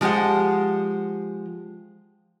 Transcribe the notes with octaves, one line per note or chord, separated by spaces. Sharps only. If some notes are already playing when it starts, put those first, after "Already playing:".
F3 G#3 G4 C5 F#5